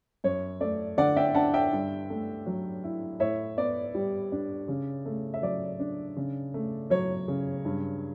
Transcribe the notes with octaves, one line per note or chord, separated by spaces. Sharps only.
F#2 C#5
A3 D5
D3 D5 F#5
E5 G5
D4 F#5 A5
E5 G5
G2
A3
F#3
E4
A2 C#5 E5
B3 D5
G3
D4
C#3
A3
E5
F#3 D5
D4
C#3
A3
F#3 C#5
C#3
G2